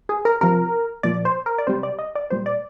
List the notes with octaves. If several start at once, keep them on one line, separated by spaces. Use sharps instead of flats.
G#4
A#4
C3 F3 A#4
A#2 F3 D5
C5
A#4
D5
C3 G3 C5
D5
D#5
D5
A#2 G3 C5
D5